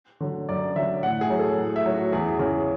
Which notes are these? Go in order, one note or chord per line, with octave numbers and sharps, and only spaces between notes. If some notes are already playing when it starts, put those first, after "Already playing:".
D3 F#3
F#2 D5
D3 F#3 E5
A2 F#5
G#4
F#3
A4
A2
E5
F#3
F#4
E2 G#4
C#3 E3 G#4